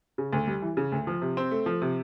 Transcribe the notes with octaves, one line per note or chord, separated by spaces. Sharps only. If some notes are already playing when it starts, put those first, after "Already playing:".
C#3
D2
G3
E3
C#3
D2
F3
C3
C4
A3
F3
C3